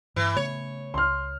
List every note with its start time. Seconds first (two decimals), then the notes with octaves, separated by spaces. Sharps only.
0.16 G2 E3
0.36 C#3 A3 B3 C#5
0.94 C#2 C6 F6